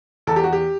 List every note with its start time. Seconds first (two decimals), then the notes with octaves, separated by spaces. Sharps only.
0.27 E2 A4
0.36 G4
0.44 F#4
0.53 G4